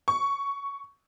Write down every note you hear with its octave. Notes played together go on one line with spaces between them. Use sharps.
C#6